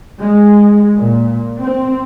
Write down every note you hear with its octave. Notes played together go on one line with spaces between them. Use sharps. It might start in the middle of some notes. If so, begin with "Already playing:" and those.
G#3
A#2
C4